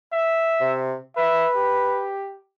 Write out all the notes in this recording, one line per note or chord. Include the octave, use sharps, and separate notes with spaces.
E5
C3
B4 E5
G4